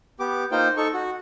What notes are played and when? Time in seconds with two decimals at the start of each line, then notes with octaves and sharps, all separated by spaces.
0.20 B3 G4 D6
0.52 A#3 D#4 F4 C5 G5
0.77 D#4 A4 C#6
0.94 F#4